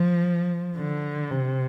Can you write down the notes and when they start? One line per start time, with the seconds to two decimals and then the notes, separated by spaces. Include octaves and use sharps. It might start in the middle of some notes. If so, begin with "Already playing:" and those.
Already playing: F3
0.77 D3
1.31 C3